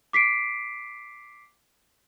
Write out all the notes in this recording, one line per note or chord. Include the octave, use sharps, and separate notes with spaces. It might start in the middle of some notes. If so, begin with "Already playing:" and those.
D6 B6 C7 D7